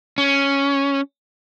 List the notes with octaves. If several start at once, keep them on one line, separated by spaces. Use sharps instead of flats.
C#4